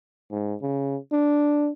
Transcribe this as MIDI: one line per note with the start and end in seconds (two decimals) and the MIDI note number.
0.31 0.55 44
0.62 0.97 49
1.12 1.70 62